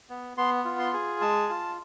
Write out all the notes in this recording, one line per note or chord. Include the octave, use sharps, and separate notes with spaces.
B3
B3 C6
F4
C6
G#4
G#3 A5
F4